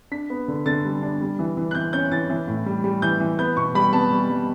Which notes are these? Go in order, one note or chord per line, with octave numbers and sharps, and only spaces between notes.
D4 B6
B3
D3
D3 A6
G3
D4
G3
E3
E3
F#6
E3 G6
C#4 G6
E3 A6
E3
A2
G3
G3
E3 G6
E3
B3 G6
B2 C#6
G3 B5
B3 A5
G3
G3